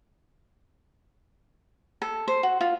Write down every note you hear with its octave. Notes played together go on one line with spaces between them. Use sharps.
A4
C5
F#4
F4